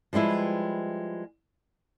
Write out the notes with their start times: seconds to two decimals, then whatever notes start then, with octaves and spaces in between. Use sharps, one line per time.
0.13 F3 G3 G#3 E4 B4